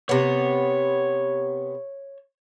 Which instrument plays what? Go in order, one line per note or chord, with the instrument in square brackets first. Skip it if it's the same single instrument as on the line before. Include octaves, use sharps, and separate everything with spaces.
[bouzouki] C3 B3 [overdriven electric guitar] C#5